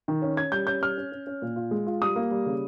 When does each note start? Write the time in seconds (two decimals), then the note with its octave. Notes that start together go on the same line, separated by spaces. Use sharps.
0.08 D#3
0.22 C#4
0.37 C#4 G#6
0.52 G3 G6
0.67 C#4 G6
0.82 G3 F6
0.98 C#4
1.12 C#4
1.27 C#4
1.42 A#2
1.56 F4
1.71 G#3
1.87 F4
2.02 G3 D#6
2.16 A#3
2.31 G3
2.46 C#3